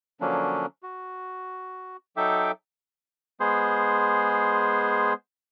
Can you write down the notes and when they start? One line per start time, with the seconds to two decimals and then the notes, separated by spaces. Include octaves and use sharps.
0.21 D3 F3 F#3 A#3 C#4 D4
0.83 F#4
2.17 F#3 D#4 A4 E5 G5 D6
3.40 G#3 B3 G#4 C5 C6